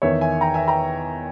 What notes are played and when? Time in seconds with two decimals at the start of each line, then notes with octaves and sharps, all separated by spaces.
0.02 E2 D#3 C#5 E5
0.21 E5 G#5
0.41 G5 A#5
0.54 E5 G#5
0.68 G5 A#5